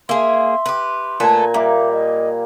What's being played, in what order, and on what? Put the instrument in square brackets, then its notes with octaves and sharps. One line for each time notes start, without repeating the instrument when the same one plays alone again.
[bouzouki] A#3 G#4 [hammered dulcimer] E5 [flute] C6
[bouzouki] G4 B4
[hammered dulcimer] A#2 G#5 [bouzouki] A3 B4 A5
[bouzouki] G3 [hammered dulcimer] A#3 D6 [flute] E5
[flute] D#5